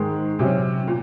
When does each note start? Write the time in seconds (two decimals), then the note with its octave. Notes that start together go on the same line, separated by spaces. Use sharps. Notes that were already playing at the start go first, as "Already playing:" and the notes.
Already playing: G#2 D#3 G#3
0.39 C3 F#3 C#4
0.87 A#2